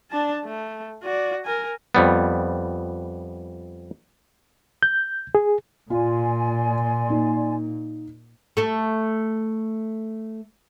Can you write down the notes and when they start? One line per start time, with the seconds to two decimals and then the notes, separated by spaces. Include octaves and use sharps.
0.11 D4 A5
0.44 A3
1.03 F#4 D5
1.46 A#4 G#5
1.95 F2 G3 B3
4.83 G6
5.35 G#4
5.90 A#2 F4 D5 G#5 C6
7.09 A#3 D#4
8.57 A3 A4